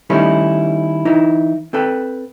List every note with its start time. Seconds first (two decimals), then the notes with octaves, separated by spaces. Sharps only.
0.10 D#3 G3 A3 C#4 D#4 E4
1.05 E3 D#4 E4
1.73 C4 A4 B4 G5